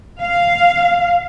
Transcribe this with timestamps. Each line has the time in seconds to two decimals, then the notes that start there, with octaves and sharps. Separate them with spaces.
0.21 F5